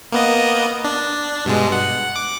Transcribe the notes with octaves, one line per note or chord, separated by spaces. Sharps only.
A#3 B3 D#5
D4
G2 B2 G#3
F#5
D6